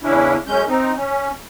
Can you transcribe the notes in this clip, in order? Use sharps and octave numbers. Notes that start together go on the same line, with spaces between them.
E2 C#3 C#4 D4 E4
F#2 G#3 C#4 G6
C4 D#4
C#4